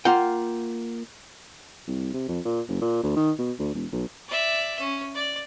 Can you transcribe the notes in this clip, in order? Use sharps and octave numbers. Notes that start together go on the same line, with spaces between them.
A#3 F4 F#5 G5
C2
C3
F2
A#2
F#1
A#2
D2
D#3
B2
D2
E1
B1
D5 E5
C#4
D5